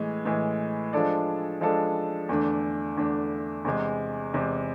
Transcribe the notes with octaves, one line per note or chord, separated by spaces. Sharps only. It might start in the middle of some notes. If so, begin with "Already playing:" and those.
Already playing: A2 E3 G#3
A2 E3 G#3
F3 G#3 D4 A4 D5
F3 G#3 D4 A4 D5
E2 D3 A3 D4
E2 D3 A3 D4
E2 C3 G#3
E2 C3 G#3